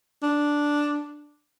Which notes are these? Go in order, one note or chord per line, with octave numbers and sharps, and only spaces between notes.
D4